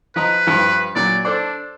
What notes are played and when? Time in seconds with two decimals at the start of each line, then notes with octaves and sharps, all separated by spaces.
0.16 F3 B4 D#5 A#5
0.47 G2 F3
0.96 A#2 F#3 D5
1.25 D4 A4 C5 D5